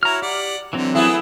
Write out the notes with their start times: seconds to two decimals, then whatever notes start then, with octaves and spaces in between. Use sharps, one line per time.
0.03 E4 F#4 C#5 A#5 F6
0.22 G4 D5 F#5
0.73 D3 E3 F#3 C4
0.95 A3 B3 E4 G#4 B4